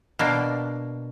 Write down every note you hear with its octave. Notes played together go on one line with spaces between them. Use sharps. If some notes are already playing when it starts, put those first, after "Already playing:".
B2 A#3 D4